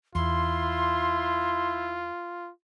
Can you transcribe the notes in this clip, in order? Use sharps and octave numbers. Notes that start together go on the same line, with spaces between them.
E2 E4 F4 C6